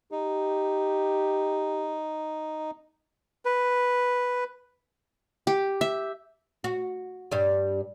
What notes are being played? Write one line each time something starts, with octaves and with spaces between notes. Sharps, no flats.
D#4 G4
B4
G4
E5
F#4
G2 G3